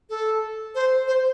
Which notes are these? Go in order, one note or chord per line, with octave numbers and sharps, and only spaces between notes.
A4
C5
C5